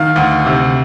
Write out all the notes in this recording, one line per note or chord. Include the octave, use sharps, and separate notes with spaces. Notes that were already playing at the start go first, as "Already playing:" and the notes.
Already playing: D#3 F5
D2
C3